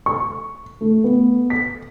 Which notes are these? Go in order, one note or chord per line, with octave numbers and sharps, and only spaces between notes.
C#6
A3
B3
B6